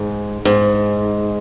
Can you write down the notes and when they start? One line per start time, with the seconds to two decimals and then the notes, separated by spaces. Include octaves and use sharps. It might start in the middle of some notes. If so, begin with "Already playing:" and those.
Already playing: G#2
0.45 G#2